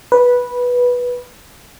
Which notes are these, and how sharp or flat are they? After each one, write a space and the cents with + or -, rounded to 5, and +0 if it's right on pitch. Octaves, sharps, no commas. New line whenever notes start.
B4 -10